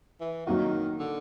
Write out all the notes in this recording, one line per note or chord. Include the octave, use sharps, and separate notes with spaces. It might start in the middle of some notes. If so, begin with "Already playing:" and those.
E3
D#3 F#3 A#3 D#4 F#4
D3